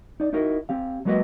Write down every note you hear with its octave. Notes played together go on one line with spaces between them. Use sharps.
D#4 D5
D#4 E4 F#4 A#4 D#5
C4 G4 F5
F#3 G#3 A#3 F#4 B4 D#5